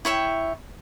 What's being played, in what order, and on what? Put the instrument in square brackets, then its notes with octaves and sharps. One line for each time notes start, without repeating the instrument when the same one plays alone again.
[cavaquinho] E4 C#5 E5 G5